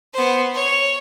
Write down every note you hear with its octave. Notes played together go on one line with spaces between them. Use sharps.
B3 C5
C#5